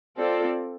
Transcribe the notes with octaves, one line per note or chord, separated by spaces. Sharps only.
C4 F4 A4 D5